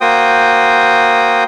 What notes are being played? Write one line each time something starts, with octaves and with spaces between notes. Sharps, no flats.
A#3 F#4 C5 G5 D#6